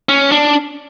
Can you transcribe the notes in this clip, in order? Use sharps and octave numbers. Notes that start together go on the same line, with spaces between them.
C#4
D4